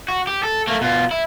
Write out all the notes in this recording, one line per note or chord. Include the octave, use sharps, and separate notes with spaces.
F#4
G4
A4
A3 A#3
B2 F4
E4